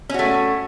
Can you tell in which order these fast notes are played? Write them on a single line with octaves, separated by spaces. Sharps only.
C#4 F#4 A3